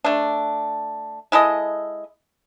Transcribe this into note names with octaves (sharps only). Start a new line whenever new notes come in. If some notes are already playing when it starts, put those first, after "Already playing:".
A3 D4
G#3 E4 A4 D#5